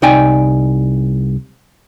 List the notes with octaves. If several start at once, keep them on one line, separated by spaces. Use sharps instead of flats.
C2 D#4 D5 G5 G#5